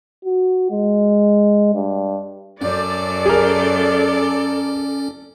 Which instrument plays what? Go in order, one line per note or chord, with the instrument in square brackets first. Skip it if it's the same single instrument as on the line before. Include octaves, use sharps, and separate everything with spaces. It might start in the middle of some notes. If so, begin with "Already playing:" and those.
[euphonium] F#4
G#3
G2
[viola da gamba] F#2 [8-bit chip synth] C#4 [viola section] A4 D5
[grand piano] G#4 A#4